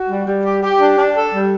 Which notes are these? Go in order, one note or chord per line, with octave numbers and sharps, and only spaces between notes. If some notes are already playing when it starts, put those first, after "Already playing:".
Already playing: F#4
G3
G3
G4
G4
D4
D4
A4
G3